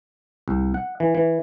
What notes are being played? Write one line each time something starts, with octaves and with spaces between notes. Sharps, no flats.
C2
F#5
E3
E3